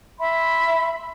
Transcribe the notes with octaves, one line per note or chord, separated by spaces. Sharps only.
E5 B5 C6